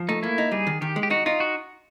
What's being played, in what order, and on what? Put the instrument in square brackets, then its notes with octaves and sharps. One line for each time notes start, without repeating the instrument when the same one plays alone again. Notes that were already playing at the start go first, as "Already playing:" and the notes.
Already playing: [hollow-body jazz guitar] F3
[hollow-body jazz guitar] A3 [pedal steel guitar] D#4
[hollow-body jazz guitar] A#3 [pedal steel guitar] E4
[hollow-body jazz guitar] D#4
[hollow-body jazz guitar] G3 [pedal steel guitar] G#4
[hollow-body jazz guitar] D#3
[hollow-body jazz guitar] D#3 [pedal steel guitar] G4
[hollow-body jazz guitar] G#3
[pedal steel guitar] G4
[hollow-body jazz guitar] D#4 [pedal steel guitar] F#4
[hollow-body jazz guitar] D#4 [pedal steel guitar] F4
[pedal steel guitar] F#4